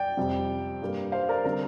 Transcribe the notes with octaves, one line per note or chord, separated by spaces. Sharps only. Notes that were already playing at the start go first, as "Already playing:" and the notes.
Already playing: D5 G5
F2 C3 G3
G2 G3 A#3
C5 F5
A#4 D5
D3 G3 C4 A#4